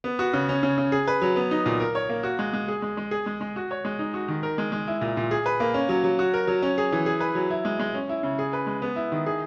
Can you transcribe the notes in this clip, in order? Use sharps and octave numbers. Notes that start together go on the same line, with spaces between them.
B3
F#4
C#3
C#4
C#3
C#3
G#4
B4
F#3
B3
D#4
A#2
A#4
C#5
A#3
F#4
G#3
G#3
G#4
G#3
G#3
G#4
G#3
G#3
F#4
C#5
G#3
D#4
F#4
D#3
A#4
G#3
G#3
E4
A#2
A#2
G#4
B4
A#3
C#4
F#3
F#3
F#4
A#4
F#3
C#4
G#4
E3
G#4
B4
F#3
E4
G#3
G#3
C#4
E4
C#3
G#4
B4
G#3
B3
E4
D#3
G#4